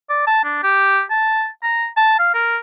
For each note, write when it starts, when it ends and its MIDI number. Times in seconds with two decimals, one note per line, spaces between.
0.09 0.25 74
0.27 0.44 81
0.45 0.60 62
0.63 1.02 67
1.10 1.48 81
1.63 1.87 82
1.97 2.19 81
2.19 2.34 77
2.35 2.57 70